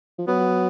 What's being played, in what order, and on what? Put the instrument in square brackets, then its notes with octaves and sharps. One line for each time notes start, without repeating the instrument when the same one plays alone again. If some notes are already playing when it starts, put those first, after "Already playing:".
[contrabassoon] F3
[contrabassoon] F#3 [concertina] B3